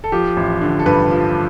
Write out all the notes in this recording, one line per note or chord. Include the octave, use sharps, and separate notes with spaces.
A4
F3 G4
A1
D3
A4
G2 B4
F3